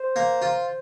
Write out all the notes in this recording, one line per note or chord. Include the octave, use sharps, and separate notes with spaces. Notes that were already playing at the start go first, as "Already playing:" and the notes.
Already playing: C5
A#3
F4